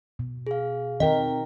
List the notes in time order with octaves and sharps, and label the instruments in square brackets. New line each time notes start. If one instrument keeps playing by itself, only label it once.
[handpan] B2
[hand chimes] G#4 F5
[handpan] D#3 A#4 [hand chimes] C4 G5 [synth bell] D#5